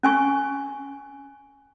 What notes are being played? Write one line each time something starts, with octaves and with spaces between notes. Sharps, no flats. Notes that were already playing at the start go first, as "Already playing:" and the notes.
C#4 G#5 C#6